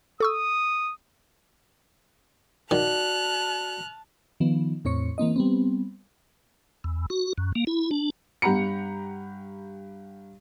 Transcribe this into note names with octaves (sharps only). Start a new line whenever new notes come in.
A4 C#6 D#6 E6
D#3 F#4 D5 A5 F6 F#6
D#3 F3 B3
E2 A2 C4 C#5 C#6 C#7
E3 A#3 C4 D#5
G3 B3 C4
E2
F#4
F#2
A#3
E4
D4
G2 G4 F#5 A#5 B5 C#7